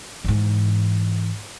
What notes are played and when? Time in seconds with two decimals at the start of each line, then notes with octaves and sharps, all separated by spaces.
0.24 G#2 E3